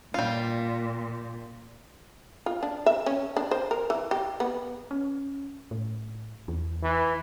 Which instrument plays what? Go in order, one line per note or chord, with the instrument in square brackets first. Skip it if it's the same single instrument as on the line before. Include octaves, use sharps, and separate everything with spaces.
[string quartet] A#2 [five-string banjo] G3 F4
[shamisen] F4
D4
E5
C#4
D4
C5
A#4
E3
G4
B3
[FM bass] C#4
A2
E2
[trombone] E3